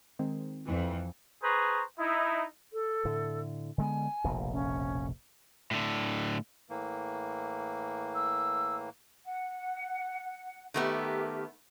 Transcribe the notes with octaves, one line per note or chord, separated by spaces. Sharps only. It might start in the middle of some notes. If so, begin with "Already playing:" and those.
D#3 G#3 C4
F2 E3
G#4 B4 C5 A#5 C#6
D#4 E4
A4
A2 D3
D3 G#3 B3 G#5
F1 A#1 B2
C#4
A2 D3
A2 E3 A#3
E6
F#5
D#3 A3 B3 G4 A#4 E5